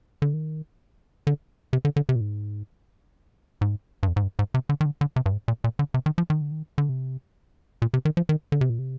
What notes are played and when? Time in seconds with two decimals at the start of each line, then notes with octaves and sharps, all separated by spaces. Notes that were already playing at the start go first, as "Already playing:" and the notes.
0.22 D3
0.34 D#3
1.27 D3
1.73 C3
1.85 D3
1.96 D3
2.09 C3
2.15 A#2
2.21 G#2
3.61 G#2
4.03 G2
4.08 F2
4.16 G#2
4.23 G2
4.39 G#2
4.54 C3
4.69 D3
4.81 D#3
4.86 D3
5.01 D3
5.16 C3
5.26 G2
5.32 G#2
5.48 A#2
5.64 A#2
5.79 D3
5.94 C3
6.06 D#3
6.18 F3
6.30 D#3
6.41 D3
6.52 D#3
6.78 D3
6.89 C3
7.82 A#2
7.94 C3
8.05 D#3
8.17 F3
8.29 D#3
8.52 D3
8.61 C3
8.70 A#2
8.79 C3